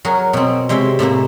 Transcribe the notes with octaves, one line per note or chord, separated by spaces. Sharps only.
F#3 F#4 G#4 A#4
B2 C4
C3 G#3 C#5 E5 G5 C6
A2 C3 A#3 C5